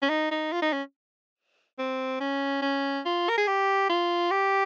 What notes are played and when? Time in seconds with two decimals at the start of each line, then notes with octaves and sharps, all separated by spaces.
0.02 C#4
0.09 D#4
0.31 D#4
0.52 F4
0.62 D#4
0.73 C#4
1.79 C4
2.21 C#4
2.62 C#4
3.05 F4
3.29 A#4
3.38 G#4
3.47 G4
3.89 F4
4.31 G4